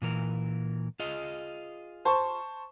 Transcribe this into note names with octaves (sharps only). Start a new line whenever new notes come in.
A#2 E3 A#4
F4 G#4 D#5
C5 A5 C#6